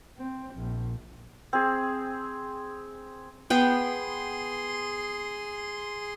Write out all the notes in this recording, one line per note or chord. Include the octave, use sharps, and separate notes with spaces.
C4
A#1
C4 G#4
B3 G#4 G5 C6